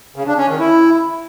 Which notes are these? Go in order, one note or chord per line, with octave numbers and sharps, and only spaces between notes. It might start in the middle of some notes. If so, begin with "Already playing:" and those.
C#3
D4
C#4
D#3
E4